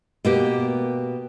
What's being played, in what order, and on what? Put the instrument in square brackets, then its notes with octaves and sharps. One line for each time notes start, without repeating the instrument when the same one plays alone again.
[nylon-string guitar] B2 A#3 G4